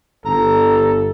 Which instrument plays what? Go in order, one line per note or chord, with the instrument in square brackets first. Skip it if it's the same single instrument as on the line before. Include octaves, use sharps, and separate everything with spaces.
[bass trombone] G1 [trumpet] A4 [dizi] A#5